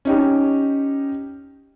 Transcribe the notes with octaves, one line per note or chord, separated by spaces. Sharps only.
C#4 D#4 G4